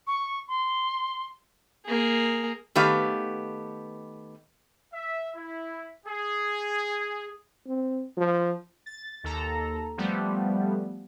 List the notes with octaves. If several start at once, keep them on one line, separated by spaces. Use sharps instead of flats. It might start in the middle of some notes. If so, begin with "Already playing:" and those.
C#6
C6
A#3 G#4
D#3 A3 B3 G4 B4 F5
E5
E4
G#4
C4
F3
A6
D#2 A4 A#5
F3 G3 A3 B3